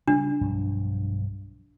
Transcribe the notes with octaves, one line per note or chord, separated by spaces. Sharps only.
C#3 G3 D4
B1 G2 F3